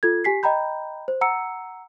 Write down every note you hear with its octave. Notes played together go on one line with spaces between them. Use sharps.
F4 A4 G#6
G4 G#5 B6 C7
D#5 G5 A#5 B5 G6
C5
F#5 A#5 E6 C#7